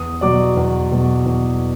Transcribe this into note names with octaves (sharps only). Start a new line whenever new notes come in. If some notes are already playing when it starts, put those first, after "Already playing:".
Already playing: E2 D#6
B2 F#3 D5 D6
E2
B2 F#3
E2